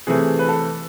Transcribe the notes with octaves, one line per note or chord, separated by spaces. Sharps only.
C3 E3 A3 G#4
B4
A4